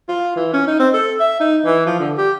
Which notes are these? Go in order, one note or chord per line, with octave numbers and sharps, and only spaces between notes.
F4
E3
C#4
D#4
C4
A4
E5
D#4
E3
F3
D3
G4